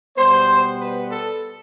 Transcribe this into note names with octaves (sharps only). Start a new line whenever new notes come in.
B2 G3 B3 C5
B4
A4